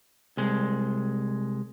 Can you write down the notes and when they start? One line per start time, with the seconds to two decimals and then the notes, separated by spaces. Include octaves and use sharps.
0.37 C2 G#3